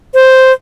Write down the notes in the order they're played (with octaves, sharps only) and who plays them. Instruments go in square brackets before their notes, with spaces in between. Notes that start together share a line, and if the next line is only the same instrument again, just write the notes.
[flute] C5